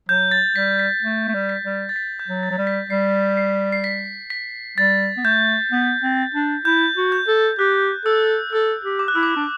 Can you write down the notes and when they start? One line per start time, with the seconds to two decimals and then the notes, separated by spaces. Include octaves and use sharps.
0.09 F#3 G6
0.31 A6
0.55 G3 B6
0.79 B6
1.02 A3
1.28 A3
1.34 G3
1.49 B6
1.64 G3
1.89 A6
1.96 B6
2.19 G6
2.28 F#3
2.43 A6
2.51 F#3
2.58 G3
2.67 B6
2.89 G3 C7
3.37 C7
3.72 C7
3.84 B6
4.30 B6
4.78 G3 A6
5.17 B3
5.24 A3 G6
5.72 B3
6.02 C4
6.34 D4
6.65 E4 G6
6.97 F#4
7.12 G6
7.28 A4
7.59 G4 F#6
8.05 A4 E6
8.52 A4 E6
8.84 G4
8.99 D6
9.08 F#6
9.15 E4 E6
9.23 D6
9.36 D4